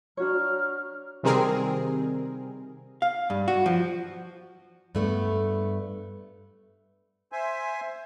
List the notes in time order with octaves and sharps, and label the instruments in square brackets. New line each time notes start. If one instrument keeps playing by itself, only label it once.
[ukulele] D4 F#4 C#5 [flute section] A#5 C#6 F6
[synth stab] C3 D#3 G3 C4 G#4 A#4
[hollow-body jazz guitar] F5
G2
F#4
F3
[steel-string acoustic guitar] G2 A3 B3
[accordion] C5 E5 G#5